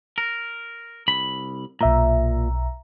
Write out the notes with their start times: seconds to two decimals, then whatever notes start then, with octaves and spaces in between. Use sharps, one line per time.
0.18 A#4
1.08 C2 B5
1.81 B1 A#2 E5 A#5